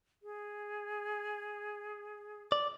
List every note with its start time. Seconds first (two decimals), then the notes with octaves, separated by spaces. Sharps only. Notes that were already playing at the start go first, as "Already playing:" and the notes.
0.23 G#4
2.52 D5